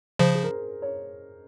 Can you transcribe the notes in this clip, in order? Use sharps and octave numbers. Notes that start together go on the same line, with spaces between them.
C#3 F3 C5
G#4
A#4
C#5